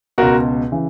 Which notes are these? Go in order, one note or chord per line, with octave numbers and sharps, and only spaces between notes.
C#2 B2 F#4 A#4
C#3 E3